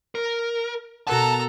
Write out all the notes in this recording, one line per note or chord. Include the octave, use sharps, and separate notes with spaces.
A#4
B2 A4 A#4 F#5 A5 A#5